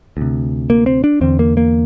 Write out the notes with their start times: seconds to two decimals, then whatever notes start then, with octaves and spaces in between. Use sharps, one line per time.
0.17 D2 C3
0.70 A#3
0.86 C4
1.04 D4
1.21 E2 D3 C4
1.39 A#3
1.57 A#3